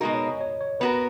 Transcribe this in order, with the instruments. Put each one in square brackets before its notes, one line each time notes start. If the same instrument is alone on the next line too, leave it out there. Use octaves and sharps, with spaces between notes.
[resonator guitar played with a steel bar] B2 G#3 D#4 A#4 [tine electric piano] F#4
[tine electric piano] C#5
D#5
C#5
C#5
[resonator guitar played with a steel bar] B3 F#4 A#4 [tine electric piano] B4